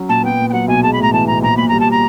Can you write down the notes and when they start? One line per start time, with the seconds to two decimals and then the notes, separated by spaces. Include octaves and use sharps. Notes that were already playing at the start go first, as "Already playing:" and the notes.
Already playing: F#3 C#4
0.09 A#2 A5
0.23 B3 G5
0.39 A#2
0.50 G5
0.53 F#3 F#5
0.68 B1 G#5
0.83 G#3 A5
0.93 B5
0.98 A2 A#5
1.12 E3 A5
1.27 B1 A#5
1.42 A#1 A#5
1.57 A#2 B5
1.68 G3 A#5
1.80 A5
1.91 A#5